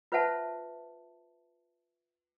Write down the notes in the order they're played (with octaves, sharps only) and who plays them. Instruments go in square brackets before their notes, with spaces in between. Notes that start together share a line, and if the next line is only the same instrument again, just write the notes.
[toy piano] F4 B4 C5 E5 F#5 A5